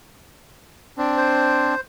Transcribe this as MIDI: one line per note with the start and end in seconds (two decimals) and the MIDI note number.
0.98 1.75 60
0.98 1.75 62
1.17 1.80 72